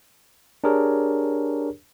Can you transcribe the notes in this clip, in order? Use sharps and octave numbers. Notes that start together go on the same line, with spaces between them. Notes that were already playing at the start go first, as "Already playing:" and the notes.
D4 G4 G#4 A#4 C#5